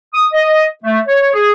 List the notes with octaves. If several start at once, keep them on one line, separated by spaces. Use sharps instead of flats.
D#6
D#5
A3
C#5
G#4